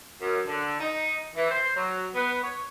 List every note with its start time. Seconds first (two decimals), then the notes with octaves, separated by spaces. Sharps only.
0.21 F#2
0.47 D3
0.80 D#4
1.36 E3
1.51 C5
1.75 F#3
2.15 B3
2.44 C#5